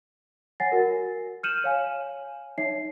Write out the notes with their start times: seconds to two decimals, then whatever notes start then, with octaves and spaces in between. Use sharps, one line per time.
0.60 C#5 F#5 G#5 A6 A#6 C7
0.72 F#4 A#4
1.43 F6 G6 C#7 D#7 E7 F#7
1.64 C#5 F5 G#5
2.58 D#4 C#5 E5 C7